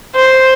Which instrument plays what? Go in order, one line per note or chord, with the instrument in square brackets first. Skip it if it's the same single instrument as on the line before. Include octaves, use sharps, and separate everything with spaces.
[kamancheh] C5